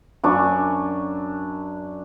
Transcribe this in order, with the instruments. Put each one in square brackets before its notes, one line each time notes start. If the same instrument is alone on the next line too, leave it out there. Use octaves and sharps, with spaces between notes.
[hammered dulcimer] F#2 D4 C#6